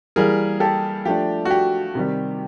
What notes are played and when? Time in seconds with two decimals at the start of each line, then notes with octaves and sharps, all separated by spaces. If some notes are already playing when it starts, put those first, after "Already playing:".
0.16 E3 G3 A#3 G#4 A#4
0.60 G4 A4
1.05 F3 A3 D4 G4
1.45 F#4
1.50 G4
1.95 C3 D#3 G3